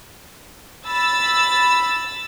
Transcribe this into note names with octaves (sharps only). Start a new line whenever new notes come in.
B5 E6 A6